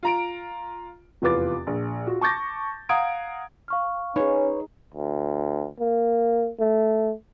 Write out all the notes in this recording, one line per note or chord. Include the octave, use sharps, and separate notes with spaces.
F4 A#5 D7
F1 E2 F4 B4 D6 A6
A#1
F4 F#4
A5 C#6 D6 G6 A6 A#6
F5 F#5 A#5 D#6 G#6 D7
F5 C#6 F6
C#4 D#4 G#4 B4 C#5
D2
A#3
A3